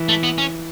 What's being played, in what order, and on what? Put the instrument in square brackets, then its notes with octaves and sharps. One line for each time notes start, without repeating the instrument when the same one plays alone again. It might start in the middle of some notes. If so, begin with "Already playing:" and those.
Already playing: [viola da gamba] E3
[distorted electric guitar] A3
B3
C#4